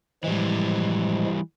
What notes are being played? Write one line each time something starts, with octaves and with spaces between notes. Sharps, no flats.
A2 E3 F3 G3 G#3